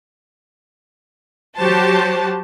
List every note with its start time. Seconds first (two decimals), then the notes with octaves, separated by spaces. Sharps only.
1.57 F#3 F#4 G4 C5 A5